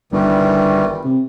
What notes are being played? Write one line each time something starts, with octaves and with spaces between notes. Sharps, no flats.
G1 D#3 E3 G3
C3